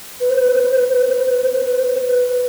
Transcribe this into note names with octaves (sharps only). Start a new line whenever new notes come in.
B4
C5
B4
C5
B4
C5
B4
C5
B4
C5
B4
C5
B4
C5
B4
C5
B4
C5
B4
C5
B4